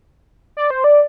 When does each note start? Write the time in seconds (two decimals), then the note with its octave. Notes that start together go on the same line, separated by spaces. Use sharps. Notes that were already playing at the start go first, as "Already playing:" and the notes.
0.57 D5
0.70 C5
0.84 D5